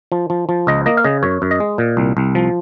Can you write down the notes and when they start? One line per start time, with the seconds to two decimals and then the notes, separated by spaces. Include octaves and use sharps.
0.12 F3
0.30 F3
0.49 F3
0.67 C#2 D#5
0.86 A#3 D#5
0.97 F5
1.04 C#3 D#5
1.23 F#2 C#5
1.42 F#2
1.51 D#5
1.60 G#3
1.78 A#2
1.97 C2
2.17 C2
2.35 F3